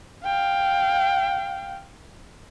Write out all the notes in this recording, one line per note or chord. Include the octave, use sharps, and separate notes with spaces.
F5 G5